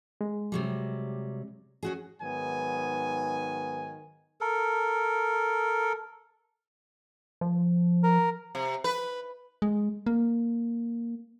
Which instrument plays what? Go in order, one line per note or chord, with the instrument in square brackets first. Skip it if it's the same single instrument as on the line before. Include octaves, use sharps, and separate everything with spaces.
[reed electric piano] G#3
[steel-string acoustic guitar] C3 F#3 G3
C#4 F#4 G#4
[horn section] G#2 D#3 F#3 B3 G#5
[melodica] A4 A#4
[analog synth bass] F3
[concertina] A#4
[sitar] C3
B4
[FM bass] G#3
A#3